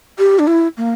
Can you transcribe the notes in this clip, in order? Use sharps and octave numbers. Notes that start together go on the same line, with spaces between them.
G4
D4
E4
A#3